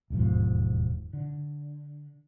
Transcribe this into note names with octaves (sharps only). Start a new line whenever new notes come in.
E1 D#2 G#2 F3
D3